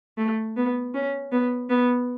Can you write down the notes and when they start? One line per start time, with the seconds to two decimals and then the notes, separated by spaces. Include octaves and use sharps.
0.18 A3
0.57 B3
0.94 C#4
1.31 B3
1.69 B3